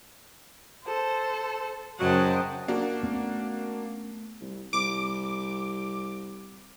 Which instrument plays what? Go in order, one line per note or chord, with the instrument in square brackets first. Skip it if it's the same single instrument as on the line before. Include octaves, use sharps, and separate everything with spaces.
[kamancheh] A4 C5
[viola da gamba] F#2 C#3 C5 [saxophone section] F#3 [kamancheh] D#5 G5 [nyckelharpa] F#5 A5
[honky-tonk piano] A#3 D4 F#4
[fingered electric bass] A3 B3 C#4
[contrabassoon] C2
[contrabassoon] C2 [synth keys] D6